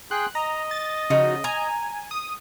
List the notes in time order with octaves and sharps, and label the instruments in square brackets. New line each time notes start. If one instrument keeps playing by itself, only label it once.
[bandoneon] G#4 G5 C6 [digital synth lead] F#6
[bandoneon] D#5 [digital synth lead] A#5
[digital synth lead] A6
[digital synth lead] C#3 [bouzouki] F3 D#4 F#4
[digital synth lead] G#5 [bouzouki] A#5
[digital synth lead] D#6